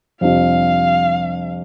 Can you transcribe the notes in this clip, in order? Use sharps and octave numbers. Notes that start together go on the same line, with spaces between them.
F2 C3 G3 D4 F4 F5